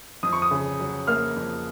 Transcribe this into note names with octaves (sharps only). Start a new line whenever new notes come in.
F2 D#6
C#6
D#6
C#3
F#3
A#3 F6
F2